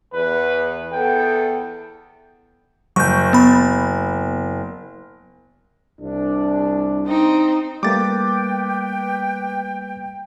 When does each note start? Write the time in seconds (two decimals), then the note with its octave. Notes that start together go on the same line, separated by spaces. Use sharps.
0.13 E2 B4
0.92 E2 B3 A4 G5
2.96 F#1 C#6 G6
3.33 B3 B5
6.01 C2 D4
7.07 C4 D#4
7.83 G3 A3 A#3 B4 G5 D6 A6